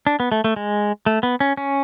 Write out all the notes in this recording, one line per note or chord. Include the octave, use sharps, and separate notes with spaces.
D4
B3
A3
A3
G#3
A3
B3
C#4
C#4